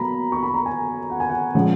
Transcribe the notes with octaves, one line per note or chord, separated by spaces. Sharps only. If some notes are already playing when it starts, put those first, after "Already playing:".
Already playing: B2 F#3 A#3 A#5 B5
C#6
B5
A#5
G#5
F#5
G#5
F#5
A#2 F3 G#3 C#4 F#5